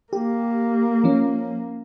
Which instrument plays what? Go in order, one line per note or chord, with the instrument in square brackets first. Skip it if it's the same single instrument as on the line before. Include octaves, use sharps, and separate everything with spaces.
[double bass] A#3 [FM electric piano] G4
[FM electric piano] F3 C#4